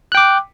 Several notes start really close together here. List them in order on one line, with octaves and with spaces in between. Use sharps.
F#6 G5 D6